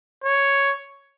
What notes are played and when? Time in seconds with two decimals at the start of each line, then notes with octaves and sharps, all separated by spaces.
0.24 C#5